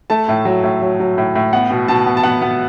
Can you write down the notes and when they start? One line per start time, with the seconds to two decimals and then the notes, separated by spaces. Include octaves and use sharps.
0.10 A3 A5
0.29 A2
0.45 F#3
0.64 A2
0.81 F#3
1.00 F#3
1.18 A2
1.35 A2
1.53 B3 F#5
1.71 B2
1.88 B2 A5
2.06 B3
2.17 A5
2.23 B3 F#5
2.42 B3